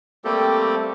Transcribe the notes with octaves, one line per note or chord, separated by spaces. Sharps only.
G3 A3 A#3 C4 G4 A4